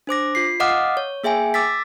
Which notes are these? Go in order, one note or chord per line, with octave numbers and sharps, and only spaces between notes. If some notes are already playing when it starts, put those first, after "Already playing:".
D4 C5 D6 A#6
F4 C7
D#5 F5 F#5 D6 D#6 F6
C#5
A#3 G#4 E5 G5 G#5
D6 E6 A6 B6